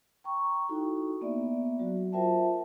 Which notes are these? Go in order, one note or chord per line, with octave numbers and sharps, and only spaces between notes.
G5 A#5 C#6
D#4 E4 F#4 A4
A#3 B3 D5 E5
F#3 F#4
F4 A#4 C5 E5 G5 A5